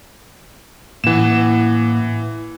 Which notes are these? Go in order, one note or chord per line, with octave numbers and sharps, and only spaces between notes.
A2 E3 A#3 F#5 E7